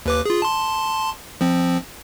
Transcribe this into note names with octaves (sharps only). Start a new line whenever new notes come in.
D#2 B4 D6
F4 G#4
A5 C6
F3 C4